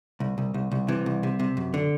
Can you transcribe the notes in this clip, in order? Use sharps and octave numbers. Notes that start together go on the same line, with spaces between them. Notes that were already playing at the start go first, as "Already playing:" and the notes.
C2
C2
C2
C2
C3 E3
C2
C3
C3
F#2
D3